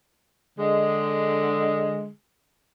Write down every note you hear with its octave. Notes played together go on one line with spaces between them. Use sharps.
D3 G#3